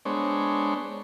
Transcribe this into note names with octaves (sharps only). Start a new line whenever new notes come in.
G#3 B3 D4 C5 C#5